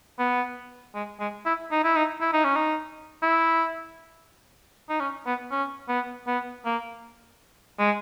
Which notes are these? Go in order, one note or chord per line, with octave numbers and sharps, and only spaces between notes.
B3
G#3
G#3
E4
D#4
E4
D#4
E4
D#4
C#4
D#4
E4
D#4
C#4
B3
C#4
B3
B3
A#3
G#3